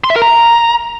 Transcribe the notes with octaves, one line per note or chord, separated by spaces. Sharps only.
C6
E5
A#4
A#5